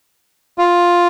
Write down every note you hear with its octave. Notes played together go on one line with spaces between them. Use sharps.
F4